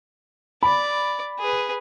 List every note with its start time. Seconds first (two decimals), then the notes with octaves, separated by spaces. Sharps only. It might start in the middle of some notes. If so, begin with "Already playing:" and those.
0.63 D5 B5
1.39 G#4 B4